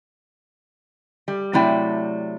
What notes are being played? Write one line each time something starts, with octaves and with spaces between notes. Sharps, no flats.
G3
C3 F#3 A3 E4 D5 G5